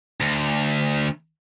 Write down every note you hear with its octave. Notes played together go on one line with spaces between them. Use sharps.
D2